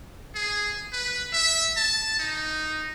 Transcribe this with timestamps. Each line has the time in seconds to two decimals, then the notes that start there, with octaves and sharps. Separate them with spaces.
0.35 G#4
0.92 B4
1.33 E5
1.77 A5
2.19 D#4